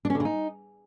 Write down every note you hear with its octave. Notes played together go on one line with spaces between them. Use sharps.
D4
C#4
D3
C#3
D#4